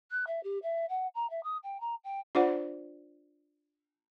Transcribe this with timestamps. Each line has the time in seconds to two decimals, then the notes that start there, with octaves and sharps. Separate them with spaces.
0.11 F#6
0.27 E5
0.43 G4
0.63 E5
0.89 F#5
1.15 A#5
1.30 E5
1.43 D#6
1.63 G5
1.80 A#5
2.04 G5
2.35 D4 F4 C5 D5 F#5